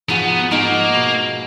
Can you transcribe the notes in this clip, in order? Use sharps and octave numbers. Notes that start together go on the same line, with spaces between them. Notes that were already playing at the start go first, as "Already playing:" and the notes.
G#2 F3 G#3 B3 D#4 F#4
G#2 F3 G#3 A#3 D#4 F#4
B2